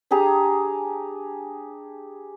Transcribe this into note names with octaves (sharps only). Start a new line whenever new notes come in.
D4 G4 G#4 A#5